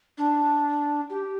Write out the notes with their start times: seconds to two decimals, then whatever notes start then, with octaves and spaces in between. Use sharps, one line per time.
0.18 D4
1.10 G4